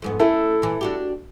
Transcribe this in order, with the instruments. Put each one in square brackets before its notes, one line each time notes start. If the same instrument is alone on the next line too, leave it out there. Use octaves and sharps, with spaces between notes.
[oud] F2 G#2 B3
[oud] A3 C#4 [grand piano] E4 A4
[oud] A#2 E3
D4 F#4 G4